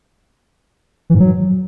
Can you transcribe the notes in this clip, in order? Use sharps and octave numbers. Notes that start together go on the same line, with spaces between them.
E3
G#2
F#3